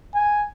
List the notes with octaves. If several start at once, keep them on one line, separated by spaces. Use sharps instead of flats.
G#5